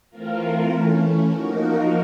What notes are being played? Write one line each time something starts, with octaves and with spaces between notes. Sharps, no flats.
E3 A3 C4 F4 A#4
E3 A3 C#4
F3 A#3 D#4 F#4 A#4